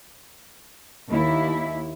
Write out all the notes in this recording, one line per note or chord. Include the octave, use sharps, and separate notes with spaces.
D#2 E4